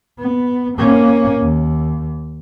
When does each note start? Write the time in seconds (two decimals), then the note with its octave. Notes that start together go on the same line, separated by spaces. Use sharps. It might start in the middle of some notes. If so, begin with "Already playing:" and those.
0.19 B3
0.78 A#3 C#4
1.42 D#2